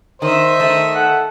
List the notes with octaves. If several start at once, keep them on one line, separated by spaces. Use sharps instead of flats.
D#3 C5 D#5 E5
D#3 A3
A4 F#5